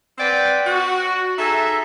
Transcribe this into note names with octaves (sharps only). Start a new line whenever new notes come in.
C4 B4 D5 F#5 G5
F#4
D#4 G#4 A4 E5